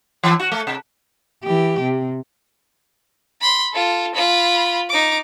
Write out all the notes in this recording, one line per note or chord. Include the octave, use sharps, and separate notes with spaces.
E3
F#4
A3
C3
E3 G4
C3
B5 C6
F4 A4
F4 B5
D#4 D6